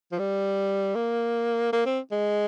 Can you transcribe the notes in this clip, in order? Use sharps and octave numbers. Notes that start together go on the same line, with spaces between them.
F3
G3
A#3
A#3
C4
G#3